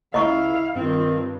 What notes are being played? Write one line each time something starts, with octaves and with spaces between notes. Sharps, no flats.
C#2 E4 D#5 F5 A#5 C#6
G2 D#3 C4 F4